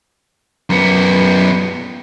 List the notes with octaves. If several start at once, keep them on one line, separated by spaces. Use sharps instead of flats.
F#2 B3